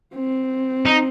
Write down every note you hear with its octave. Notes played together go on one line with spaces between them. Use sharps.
C4
D#4